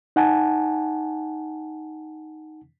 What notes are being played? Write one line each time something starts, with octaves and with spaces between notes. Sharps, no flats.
D#4 F#5 G#5 A5